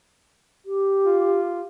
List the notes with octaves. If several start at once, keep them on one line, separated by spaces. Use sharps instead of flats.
G4
F4